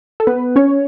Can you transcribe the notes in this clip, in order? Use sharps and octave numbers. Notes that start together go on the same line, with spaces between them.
A4
B3 B4
C#4 C#5